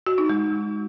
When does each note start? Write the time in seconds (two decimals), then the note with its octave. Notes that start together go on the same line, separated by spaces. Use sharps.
0.07 F#4
0.18 D#4
0.30 G#3